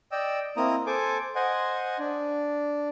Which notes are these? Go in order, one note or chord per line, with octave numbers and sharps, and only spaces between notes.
D5 D#5 G5 E6
A#3 C4 E4 D#5 A#5 D#6
A4 C5 G#5 D6
C5 D#5 F#5 G#5
D4